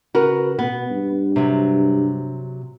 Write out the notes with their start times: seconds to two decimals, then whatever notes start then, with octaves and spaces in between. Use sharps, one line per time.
0.15 C#3 F#4 A#4 B4
0.59 B2 B3
0.90 G2
1.36 C3 F#3